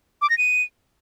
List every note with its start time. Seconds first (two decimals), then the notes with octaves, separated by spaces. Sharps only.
0.22 D6
0.30 A#6
0.38 D#7